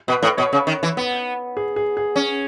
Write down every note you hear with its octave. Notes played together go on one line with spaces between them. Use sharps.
B2 B4
A2
B2 C#5
C#3
D#3
E3
B3
G#4
G#4
G#4
C#4